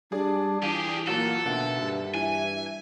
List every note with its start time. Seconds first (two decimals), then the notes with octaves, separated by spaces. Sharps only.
0.12 G3 D4 G#4 D5
0.62 E3 F4 G4 G#4
1.07 A#2 F#3 A#3 F#4 A4
1.45 D#2 B2 D3 E5 F#5
1.82 G2
2.14 E3 G#5